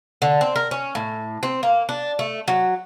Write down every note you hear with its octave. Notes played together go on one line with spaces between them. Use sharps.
D3
C4
A#4
C#4
A2
C4
A#3
D4
A3
F#3